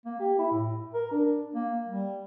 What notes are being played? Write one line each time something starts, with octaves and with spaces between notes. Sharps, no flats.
A#3
G4
E4
A2
A#4
D4
A#3
G3